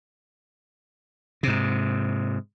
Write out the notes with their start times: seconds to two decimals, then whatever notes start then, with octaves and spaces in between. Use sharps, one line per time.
1.43 G#2 C3